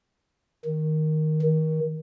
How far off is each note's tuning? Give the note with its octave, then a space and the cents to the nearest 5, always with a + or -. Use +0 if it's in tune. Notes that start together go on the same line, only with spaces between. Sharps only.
D#3 +0
D#3 +25